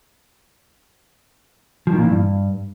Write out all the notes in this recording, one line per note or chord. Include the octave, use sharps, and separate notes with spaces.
F3
D#3
A#2
E3
G2